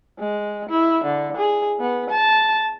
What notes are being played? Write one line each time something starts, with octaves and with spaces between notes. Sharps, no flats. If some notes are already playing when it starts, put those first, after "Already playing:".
G#3
E4
D3
G#4
B3
A5